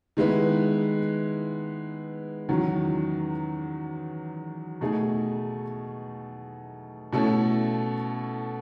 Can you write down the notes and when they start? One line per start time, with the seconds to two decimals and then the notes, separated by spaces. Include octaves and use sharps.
0.17 D#3 G#3 B3 E4 B4
2.49 E2 D#3 F#3 C#4 F#4
4.81 B2 A3 D#4 G#4
7.13 B2 A3 C#4 E4 A4